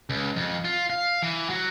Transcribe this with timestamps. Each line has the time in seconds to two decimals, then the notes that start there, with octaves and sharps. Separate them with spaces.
0.10 C#2
0.36 F2
0.65 F4
0.90 F5
1.23 E3
1.49 F#3